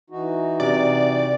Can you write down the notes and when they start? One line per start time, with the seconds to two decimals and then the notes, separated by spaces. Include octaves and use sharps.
0.10 E3 D#4 F#4
0.60 C3 D5